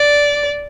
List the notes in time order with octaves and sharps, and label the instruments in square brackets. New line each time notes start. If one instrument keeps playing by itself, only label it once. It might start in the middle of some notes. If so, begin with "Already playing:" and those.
Already playing: [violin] D5